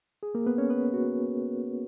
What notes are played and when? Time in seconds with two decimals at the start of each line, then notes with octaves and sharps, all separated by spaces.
0.23 G#4
0.35 A#3 A#4
0.46 B3 B4
0.58 C#4 C#5
0.70 B3 B4
0.94 F#4